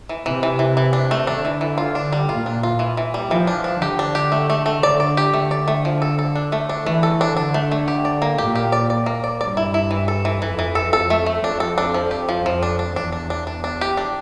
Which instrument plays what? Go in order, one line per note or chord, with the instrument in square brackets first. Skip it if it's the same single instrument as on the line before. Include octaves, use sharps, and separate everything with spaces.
[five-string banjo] E3
[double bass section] C3 [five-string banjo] E3
[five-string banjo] E3
E3
E3
D4
A3
[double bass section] D3 [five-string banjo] D4
[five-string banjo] E3
E3
F4
D4
G3
[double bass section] A#2 [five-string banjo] F4
[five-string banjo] D4
F4
E3
E3
G3
[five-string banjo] E3 [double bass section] F3
[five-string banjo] D4
D4
[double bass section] D3 [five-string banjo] G4
[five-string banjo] D4
G4
A3
A3
A3
[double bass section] D3 [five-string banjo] D5
[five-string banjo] D5
G4
[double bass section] D3 [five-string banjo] A3
[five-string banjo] D5
A3
F3
A4
A4
D4
A3
D4
[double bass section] E3 [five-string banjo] A3
[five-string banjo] A4
D4
[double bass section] D3 [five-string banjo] D4
[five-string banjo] A3
A3
G4
D5
A#3
[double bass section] A#2 [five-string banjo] G4
[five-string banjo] G4
D5
D5
A#3
D5
[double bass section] G2 [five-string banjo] D5
[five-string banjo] E4
E4
E3
A4
E3
[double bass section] F2 [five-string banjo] E3
[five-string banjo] E3
A4
[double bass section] F2 [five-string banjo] A4
[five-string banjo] A3
A3
[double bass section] F2 [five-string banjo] D4
[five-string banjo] A4
D4
F3
G4
F3
[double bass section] F2 [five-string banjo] F3
[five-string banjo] D4
D4
[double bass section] E2 [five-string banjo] D4
[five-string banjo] D4
D4
D4
D4
G4
D4